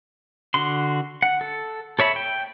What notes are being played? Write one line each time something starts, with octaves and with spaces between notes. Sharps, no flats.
D3 F#4 C6
F#5
A4
A4 C#5 E5 B5
G5